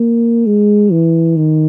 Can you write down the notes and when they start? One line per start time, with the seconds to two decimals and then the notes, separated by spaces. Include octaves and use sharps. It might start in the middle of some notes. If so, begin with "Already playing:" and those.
Already playing: A#3
0.47 G#3
0.92 E3
1.37 D#3